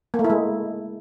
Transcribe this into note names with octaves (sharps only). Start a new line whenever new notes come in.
A#3
A3
E4
G#3